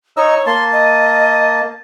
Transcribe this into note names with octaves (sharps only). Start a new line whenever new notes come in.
D#4 C#5 D#5 E6
A#3 A5 C6
D#5